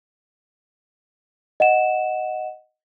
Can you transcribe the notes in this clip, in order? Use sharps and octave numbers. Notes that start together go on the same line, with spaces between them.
D#5 F#5 E7